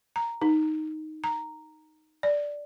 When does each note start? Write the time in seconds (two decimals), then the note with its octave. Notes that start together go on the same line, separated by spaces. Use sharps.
0.16 A#5
0.42 D#4
1.24 A#5
2.23 D5